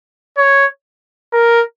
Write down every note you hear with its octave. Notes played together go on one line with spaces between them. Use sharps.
C#5
A#4